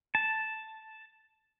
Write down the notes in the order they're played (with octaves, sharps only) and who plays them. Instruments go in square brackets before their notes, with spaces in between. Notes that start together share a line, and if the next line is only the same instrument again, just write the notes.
[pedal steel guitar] A5